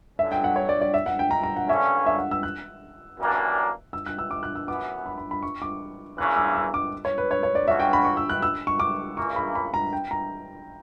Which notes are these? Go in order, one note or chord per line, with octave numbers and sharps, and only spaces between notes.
D3 F#3 C#4 E5
G5
F#5
C#5
D5
D5
E5
F#5
G5
A#5
A#5
F#5
G2 D3 A#3 C#4 E5
E5
F#5
E6
F#6
F#2 E3 G3 A#3 D4
E6
F#6
E6
D6
F#6
E6
F#2 E3 B3 D6
B5
B5
B5
C#6
D6
E2 C#3 E3 A#3 C#4 F#6
E6
E6
D6
C#5
B4
C#5
C#5
D5
C#2 B2 A#3 C#4 F#4 E5
G5
B5
C#6
E6
F#6
E6
C#6
D6
C#2 C#3 E3 A#3 C#6
B5
B5
A#5
G5
A#5